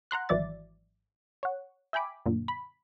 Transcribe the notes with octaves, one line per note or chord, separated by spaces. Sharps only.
F#5 A#5 C6 F#6
G#1 E3 F#3 D5 E5 A6
C#5 F#5
E5 G5 G#5 B5 D6
F#2 A#2 D3
B5